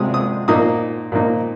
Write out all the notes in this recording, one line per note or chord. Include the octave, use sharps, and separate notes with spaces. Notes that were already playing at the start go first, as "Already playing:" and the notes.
Already playing: C3 F3 G#3 D#6
D#6
A#2 F3 A#3 D#4 D#6
A#2 F3 A#3 D#4